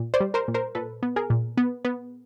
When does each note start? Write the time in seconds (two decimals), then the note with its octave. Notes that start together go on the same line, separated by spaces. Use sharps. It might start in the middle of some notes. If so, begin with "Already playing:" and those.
Already playing: A#2
0.14 C5 D5
0.20 G3
0.34 A#4 C5
0.48 A#2
0.54 A#4 C5
0.75 A#2 A4 B4
1.03 B3
1.16 G#4 A#4
1.30 A#2
1.57 B3
1.85 B3